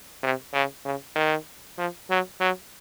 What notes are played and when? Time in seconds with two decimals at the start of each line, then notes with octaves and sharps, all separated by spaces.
0.23 C3
0.54 C#3
0.85 C#3
1.15 D#3
1.78 F3
2.10 F#3
2.41 F#3